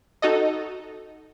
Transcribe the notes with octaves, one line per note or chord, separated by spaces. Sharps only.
D#4 F#4 A4 D#5